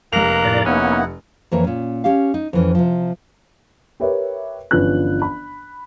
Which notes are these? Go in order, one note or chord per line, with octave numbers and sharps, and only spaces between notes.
F1 A#3 A#5 F#6 F7
A2 D5
A#3 B3 C#4 D#4 E4 F#5
F2 E3 A#3 C#5
A#2 C#4
C#4 G4 F5
D#4
F2 E3 C#4
C3 F3
G4 A#4 B4 C#5 E5
G1 E3 F3 C#4 B4 F#6
B5